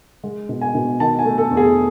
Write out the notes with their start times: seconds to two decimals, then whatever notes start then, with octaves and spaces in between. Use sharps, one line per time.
0.24 G#3
0.49 B2
0.61 G#5
0.75 B2
1.00 D#3 A5
1.19 G#5
1.25 A3
1.38 A4
1.51 E2
1.57 G#4